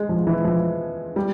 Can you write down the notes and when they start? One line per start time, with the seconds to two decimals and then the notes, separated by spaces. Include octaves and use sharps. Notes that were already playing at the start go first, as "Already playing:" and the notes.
Already playing: G#3
0.09 F3
0.27 E3
0.45 F3
1.16 G3